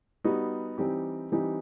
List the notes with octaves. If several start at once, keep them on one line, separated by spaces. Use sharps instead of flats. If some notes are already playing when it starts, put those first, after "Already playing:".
G3 B3 D#4 F#4
E3 G3 C4 D#4 G4
E3 G3 C4 D#4 G4